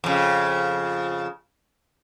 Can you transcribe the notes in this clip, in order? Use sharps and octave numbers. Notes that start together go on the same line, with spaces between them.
F2 C#3